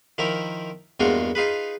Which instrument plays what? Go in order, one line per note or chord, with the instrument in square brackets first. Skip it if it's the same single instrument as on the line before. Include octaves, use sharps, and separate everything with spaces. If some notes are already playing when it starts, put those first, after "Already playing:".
[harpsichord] D#3 F3 E4 A#4
E2 G2 G#3 A#3 F4 F#4
D#4 F4 G#4 B4